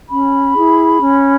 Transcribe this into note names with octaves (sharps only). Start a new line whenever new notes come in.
C#4 B5
E4 G#4
C#4